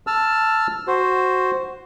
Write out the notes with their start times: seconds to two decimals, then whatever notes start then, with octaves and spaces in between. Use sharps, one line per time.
0.07 A5 E6 F6
0.88 F#4 C5